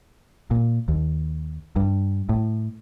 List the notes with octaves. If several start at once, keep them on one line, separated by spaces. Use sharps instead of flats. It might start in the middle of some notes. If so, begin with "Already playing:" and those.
A#2
D#2
G2
A2